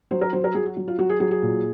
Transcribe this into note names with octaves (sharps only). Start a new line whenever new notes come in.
F#3 C5
A#4
F#3 C5
A#4
F#3 G#4
F#4
F#3
F4
F#3 F#4
G#4
F#3 G#4
G#4
A#2